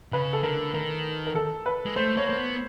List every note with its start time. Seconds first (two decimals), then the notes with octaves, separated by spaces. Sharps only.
0.13 C#3 B4
0.33 A4
0.43 D3 A#4
0.74 D#3 A#4
1.27 A#4
1.35 A4
1.66 B4
1.86 G#3
1.96 A3 C5
2.17 A#3 C#5
2.27 A#3 C5
2.37 B3